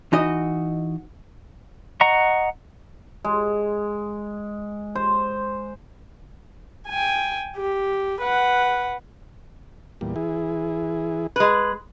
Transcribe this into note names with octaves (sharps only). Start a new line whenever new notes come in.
E3 D#4 F#4 D#5
D#5 F#5 A#5 C#6
G#3
C5
G5 G#5
G4
B4 F#5
E2 A#2 G3
E3 E4 G#4
G#3 B4